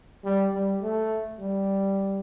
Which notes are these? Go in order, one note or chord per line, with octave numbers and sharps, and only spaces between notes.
G3
G3
A3
G3